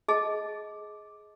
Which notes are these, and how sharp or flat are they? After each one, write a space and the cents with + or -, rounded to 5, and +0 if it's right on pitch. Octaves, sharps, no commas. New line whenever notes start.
G#4 +15 D#5 +20 A5 -15